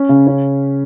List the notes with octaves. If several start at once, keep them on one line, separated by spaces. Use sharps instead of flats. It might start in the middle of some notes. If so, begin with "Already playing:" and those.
Already playing: C#4
C#3
C#4